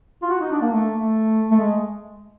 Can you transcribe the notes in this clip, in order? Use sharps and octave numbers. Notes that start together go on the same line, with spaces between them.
F4
F#4
D#4
D4
A#3
A3
A3
A3
G#3